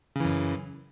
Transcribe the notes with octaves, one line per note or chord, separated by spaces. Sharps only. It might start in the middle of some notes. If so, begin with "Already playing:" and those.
F#2 C#3 E3